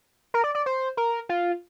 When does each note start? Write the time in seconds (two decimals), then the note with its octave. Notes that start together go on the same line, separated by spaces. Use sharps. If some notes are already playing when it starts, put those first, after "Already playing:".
0.34 A#4
0.44 D5
0.55 D5
0.66 C5
0.97 A#4
1.29 F4